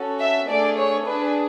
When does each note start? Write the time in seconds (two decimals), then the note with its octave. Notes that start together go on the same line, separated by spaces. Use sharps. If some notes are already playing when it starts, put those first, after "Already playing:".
Already playing: C#4 F#4 A4
0.20 E5
0.49 A3 D4 G#4 D5
0.77 C#5
1.06 D4 G#4 B4